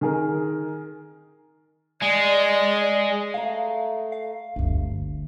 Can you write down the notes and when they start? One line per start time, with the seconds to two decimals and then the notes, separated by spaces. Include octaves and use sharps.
0.01 D#3 G#4 A#4
2.02 G#3 D5
3.34 A3 F5 A#5
4.12 F5
4.56 G1 D2